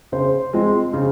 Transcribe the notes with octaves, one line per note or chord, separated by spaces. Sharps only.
C#3 C5
F3 G#3 C4
C#3